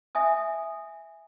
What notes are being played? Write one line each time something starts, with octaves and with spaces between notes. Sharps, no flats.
E5 G#5 D#6